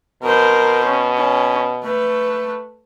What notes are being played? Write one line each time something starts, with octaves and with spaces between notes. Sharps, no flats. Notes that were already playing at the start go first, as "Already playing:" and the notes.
B2 A#4 C5
C#4
C#4
A3 B4